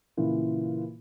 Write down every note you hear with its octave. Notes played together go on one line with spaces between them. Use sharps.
A#2 C#3 E3 F4